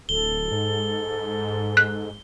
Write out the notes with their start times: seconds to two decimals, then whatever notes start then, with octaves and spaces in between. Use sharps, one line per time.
0.09 D1 A4 G7
0.52 G#2
1.77 F#6